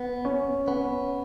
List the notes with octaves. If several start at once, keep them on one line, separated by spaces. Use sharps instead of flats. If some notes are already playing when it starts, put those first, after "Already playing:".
Already playing: B3
C#4
B3 C#4